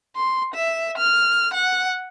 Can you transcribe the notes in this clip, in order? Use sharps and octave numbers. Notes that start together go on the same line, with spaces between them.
C6
E5
F6
F#5